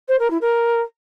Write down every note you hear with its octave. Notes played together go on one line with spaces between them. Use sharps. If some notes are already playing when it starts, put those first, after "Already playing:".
C5
A#4
E4
A#4